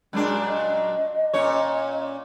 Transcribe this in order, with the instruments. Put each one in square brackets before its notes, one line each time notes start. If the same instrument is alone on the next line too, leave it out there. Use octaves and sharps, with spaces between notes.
[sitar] F#2 A#2 D4 [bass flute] G#3
[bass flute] D#5
[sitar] A#2 C#4 C#5